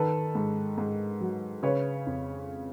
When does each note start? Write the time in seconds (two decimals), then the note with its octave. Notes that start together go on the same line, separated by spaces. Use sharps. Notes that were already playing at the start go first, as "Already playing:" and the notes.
Already playing: D#3 A4 B4
0.35 G#2
0.78 G#2
1.20 F#3
1.63 C#3 B4 C#5
2.07 F2